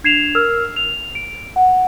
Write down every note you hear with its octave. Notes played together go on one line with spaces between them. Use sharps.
D4 G#6 C7 E7 F7
A#4 E6 F6
F7
D7
F#5